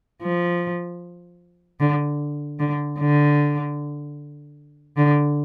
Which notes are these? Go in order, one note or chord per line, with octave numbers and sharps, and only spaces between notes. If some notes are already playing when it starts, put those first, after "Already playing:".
F3
D3
D3
D3
D3